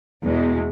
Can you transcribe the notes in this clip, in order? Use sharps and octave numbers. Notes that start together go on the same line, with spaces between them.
E2 B2 G#3